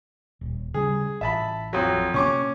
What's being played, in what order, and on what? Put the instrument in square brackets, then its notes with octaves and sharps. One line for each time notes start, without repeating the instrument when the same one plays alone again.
[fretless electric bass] D#1
[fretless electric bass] C#3 G3 [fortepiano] G#4
[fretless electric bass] A1 [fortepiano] E5 A5 B5
[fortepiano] F2 F#3
[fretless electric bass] C3 A#3 [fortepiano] C#4 C#6 D6